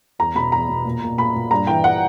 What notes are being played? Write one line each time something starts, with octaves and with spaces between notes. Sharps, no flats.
E2 A#5
B2 B5
E2 A#5
B2
A#2
A#2
A#2 B5
A#2
G2 A#5
E3 G5
F#5